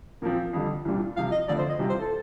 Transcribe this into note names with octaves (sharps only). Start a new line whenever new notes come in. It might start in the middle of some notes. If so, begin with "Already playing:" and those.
A#2 F3 C4 A#4
F2 D3 G3
C2 A#2 G3 D4 F4
C2 C3 F3 F5
D#5
F2 D3 F3 A3 D5
C5
D#5
C2 C3 G3 C4 F4
C5
A4